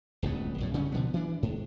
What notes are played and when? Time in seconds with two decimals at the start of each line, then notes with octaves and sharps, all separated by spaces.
0.22 D1 C#2 A2 B3
0.58 A#1 F#2 A2
0.74 C#3 G3 A#3 C#4
0.92 B2 D3 F3 B3
1.14 E3 D4
1.43 G#2